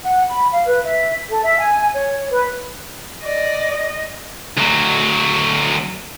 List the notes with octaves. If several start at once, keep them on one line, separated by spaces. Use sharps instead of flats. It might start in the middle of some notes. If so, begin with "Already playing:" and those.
F#5
B5
F5
B4
E5
A4
E5
G#5
C#5
B4
D5 D#5
D2 F#3